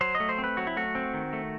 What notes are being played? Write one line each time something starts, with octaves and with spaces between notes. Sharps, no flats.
F#3 C5
D#5
A3
C5
C4
B4
F#3 F#4
E4
A3 F#4
C4
D#3
A3